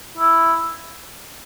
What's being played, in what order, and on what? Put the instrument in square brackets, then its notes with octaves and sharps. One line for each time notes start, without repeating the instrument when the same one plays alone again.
[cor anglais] E4